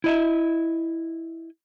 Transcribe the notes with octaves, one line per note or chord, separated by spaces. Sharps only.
E4 D#5 E5